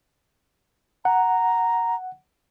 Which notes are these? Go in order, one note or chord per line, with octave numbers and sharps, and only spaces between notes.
F#5 A#5